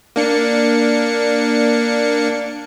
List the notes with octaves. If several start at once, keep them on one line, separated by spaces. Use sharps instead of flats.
A#3 D4 C#7